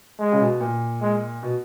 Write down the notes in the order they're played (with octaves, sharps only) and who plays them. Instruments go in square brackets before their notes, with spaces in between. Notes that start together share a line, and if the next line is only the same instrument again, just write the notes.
[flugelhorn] G#3
[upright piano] C#3
B2
A#2
[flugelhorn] G#3
[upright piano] B2